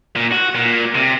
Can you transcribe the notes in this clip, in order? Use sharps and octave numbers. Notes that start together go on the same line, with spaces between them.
A#2
F#4
A#2
C3